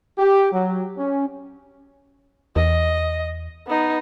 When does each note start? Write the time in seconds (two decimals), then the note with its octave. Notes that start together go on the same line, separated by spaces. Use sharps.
0.18 G4
0.52 F#3
0.98 C#4
2.56 E2 D#5
3.66 B3 D#4